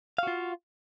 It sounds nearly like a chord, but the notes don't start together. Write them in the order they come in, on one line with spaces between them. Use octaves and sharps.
F5 F#4 F4